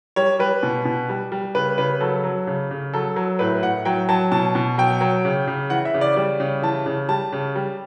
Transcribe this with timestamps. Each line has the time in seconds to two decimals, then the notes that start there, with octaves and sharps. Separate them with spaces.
0.16 G3 C#5
0.39 G3 B4
0.63 B2
0.85 B2
1.09 G3
1.32 G3
1.55 C#3 B4
1.78 C#3 B4
2.01 F#3 A4
2.24 F#3
2.47 C#3
2.71 C#3
2.93 F#3 A4
3.16 F#3
3.39 A2 B4
3.63 A2 F#5
3.85 F#3 G5
4.09 F#3 A5
4.32 B2 A5
4.55 B2
4.78 F#3 G5
5.01 F#3
5.25 C#3
5.47 C#3
5.70 E3 F#5
5.85 E5
5.94 C#3
6.01 D5
6.16 G3 D5
6.40 C#3
6.63 E3 A5
6.86 C#3
7.09 G3 A5
7.32 C#3
7.56 G3